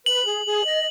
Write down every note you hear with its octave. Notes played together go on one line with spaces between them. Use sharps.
B4 F#7
G#4
G#4
D#5